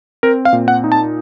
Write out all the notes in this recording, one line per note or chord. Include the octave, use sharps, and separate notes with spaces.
C4 A#4
F5
A#2
F#5
D#4
A5